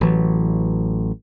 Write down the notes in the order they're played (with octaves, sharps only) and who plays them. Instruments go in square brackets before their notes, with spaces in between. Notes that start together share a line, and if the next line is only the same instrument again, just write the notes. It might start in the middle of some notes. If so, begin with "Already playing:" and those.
[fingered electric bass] A1 E3 F#3